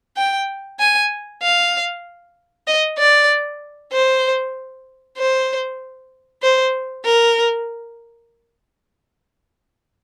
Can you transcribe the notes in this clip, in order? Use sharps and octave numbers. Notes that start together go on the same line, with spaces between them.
G5
G#5
F5
D#5
D5
C5
C5
C5
A#4